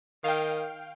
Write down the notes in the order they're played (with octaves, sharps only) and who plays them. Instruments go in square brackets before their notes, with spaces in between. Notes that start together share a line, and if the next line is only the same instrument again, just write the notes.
[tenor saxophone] D#3 [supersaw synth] F5 G5